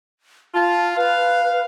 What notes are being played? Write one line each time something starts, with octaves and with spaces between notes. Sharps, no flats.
F4 A5
B4 F5